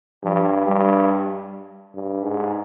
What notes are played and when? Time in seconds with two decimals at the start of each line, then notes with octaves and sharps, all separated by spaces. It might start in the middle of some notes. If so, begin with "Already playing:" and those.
0.23 G2 F3
0.66 G2 G3
1.95 G2
2.23 G#2